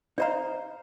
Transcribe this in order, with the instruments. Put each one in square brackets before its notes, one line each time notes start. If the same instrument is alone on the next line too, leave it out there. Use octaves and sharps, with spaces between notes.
[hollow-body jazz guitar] D#4 C5 F5 [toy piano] D5 D#5 A#5